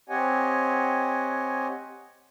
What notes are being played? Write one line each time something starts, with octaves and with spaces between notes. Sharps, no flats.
C4 G4 C#5 D#5 F#5 G#5